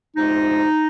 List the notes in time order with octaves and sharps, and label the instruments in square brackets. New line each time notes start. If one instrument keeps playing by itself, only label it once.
[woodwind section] D2 C3 F3 G#3 D#4